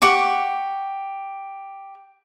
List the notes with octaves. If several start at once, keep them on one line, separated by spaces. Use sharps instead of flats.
G4 F#5 C#6 D6